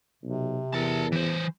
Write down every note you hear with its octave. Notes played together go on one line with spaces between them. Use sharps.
B1 C3
E2 A#4 A5
E3 C5